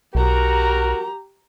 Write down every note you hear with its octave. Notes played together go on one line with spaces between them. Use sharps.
B1 F#4 G4 A#4 A#5